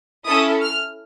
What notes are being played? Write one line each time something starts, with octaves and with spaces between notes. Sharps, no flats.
C#4 E4 A4 D#6
F6